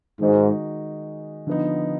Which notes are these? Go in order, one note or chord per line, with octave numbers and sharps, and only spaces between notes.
G#2 D#3 G#3 D#4 F#4
D3 F3 B3 D#4